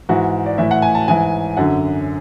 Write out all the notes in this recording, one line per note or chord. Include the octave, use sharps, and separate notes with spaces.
G#2 E3 F#4
D5
A2 E3 E5
F#5
G#5
A5
G#2 E3 G#5
F#2 D3 F#5